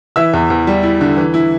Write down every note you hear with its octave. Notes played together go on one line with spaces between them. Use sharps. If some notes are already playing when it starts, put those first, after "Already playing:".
E3 E5 E6
E2
E2
G3
E4
D3
E3
E4